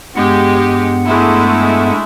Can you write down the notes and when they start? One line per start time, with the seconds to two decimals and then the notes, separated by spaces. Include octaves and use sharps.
0.16 G2 G#3 B3 G4 F#5
1.05 G#3 A3 E4